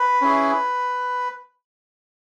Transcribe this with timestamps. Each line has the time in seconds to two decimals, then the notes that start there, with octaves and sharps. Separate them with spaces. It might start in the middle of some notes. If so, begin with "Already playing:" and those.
Already playing: B4
0.21 C#4 E4 G#4